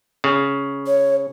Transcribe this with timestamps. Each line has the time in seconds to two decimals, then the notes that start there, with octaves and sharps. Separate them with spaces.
0.24 C#3
0.87 C#5